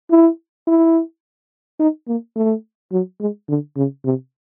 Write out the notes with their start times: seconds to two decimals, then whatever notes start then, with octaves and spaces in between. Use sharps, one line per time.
0.11 E4
0.67 E4
1.80 D#4
2.08 A#3
2.36 A3
2.92 F#3
3.20 G#3
3.49 D3
3.77 C#3
4.05 C3